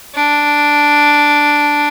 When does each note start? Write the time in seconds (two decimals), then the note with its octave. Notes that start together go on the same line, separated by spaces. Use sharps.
0.15 D4